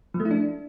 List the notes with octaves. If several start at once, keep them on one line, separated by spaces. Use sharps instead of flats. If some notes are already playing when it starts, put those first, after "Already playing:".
F3
A3
E4
D4